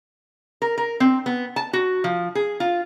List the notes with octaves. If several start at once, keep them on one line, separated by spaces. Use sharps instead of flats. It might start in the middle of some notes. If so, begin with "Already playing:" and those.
A#4
A#4
C4
B3
A5
F#4
F3
G#4
F4